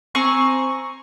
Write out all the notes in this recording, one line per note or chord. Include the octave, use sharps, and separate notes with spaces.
C4 G#5 A#5 C#6